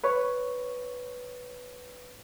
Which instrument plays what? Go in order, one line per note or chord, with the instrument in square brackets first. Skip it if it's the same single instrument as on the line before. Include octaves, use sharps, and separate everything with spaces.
[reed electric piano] B4 C#5